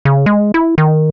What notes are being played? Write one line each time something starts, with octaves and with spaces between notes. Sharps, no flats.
C#3
G#3
E4
D#3